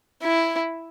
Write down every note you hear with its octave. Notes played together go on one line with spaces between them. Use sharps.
E4